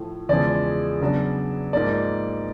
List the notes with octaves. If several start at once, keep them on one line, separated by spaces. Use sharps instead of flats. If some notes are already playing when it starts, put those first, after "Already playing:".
Already playing: A2 F3 A3
E2 C#3 F3 G#3 D5
C#3 F#3 B3 D4
G#2 F3 A#3 D5